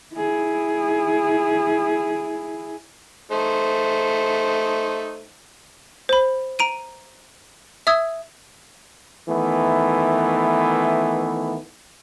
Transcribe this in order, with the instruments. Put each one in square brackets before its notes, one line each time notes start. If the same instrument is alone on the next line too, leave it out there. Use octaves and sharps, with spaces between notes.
[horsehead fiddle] E4 G#4
[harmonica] A3 D#4 C5
[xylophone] C5 B5
A#5 D7 D#7
E5 D#6 E6 G#6
[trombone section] D#3 E3 A3 B3